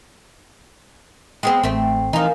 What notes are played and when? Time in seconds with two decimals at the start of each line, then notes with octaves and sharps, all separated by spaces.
1.43 G#3 B3 C4 G5
1.63 A1 A3 C4
2.13 E3 F3 D#4 A#4 F5 G#5